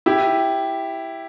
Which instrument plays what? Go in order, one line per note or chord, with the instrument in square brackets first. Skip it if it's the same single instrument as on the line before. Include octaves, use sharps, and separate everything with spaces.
[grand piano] E4 G4